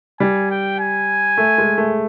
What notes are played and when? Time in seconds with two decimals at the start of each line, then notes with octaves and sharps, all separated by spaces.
0.20 G3 G#5
0.50 G5
0.79 G#5
1.37 A3
1.58 G#3
1.78 A3